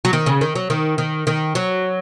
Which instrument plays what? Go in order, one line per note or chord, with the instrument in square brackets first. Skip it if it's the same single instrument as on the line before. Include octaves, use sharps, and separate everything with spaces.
[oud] F#3
D#3
C#3
D#3
F#3
D#3
D#3
D#3
F#3